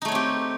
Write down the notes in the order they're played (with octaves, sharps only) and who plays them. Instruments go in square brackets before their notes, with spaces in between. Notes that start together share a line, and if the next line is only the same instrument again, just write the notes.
[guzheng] D#4
A3
C#5
C4
G4